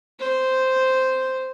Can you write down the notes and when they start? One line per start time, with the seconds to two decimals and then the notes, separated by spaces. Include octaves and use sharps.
0.20 C5